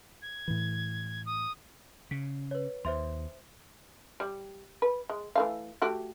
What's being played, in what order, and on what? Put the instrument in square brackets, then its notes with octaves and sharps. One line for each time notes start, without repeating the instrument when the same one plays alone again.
[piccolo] G#6
[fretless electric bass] A2 E3
[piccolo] D#6
[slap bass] C#3 [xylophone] B6
[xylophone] B4 C#5
[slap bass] D#2 [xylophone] C5 E5 C6
[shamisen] G3
B4
G#3
E3 A3 F5
A3 F#4 G4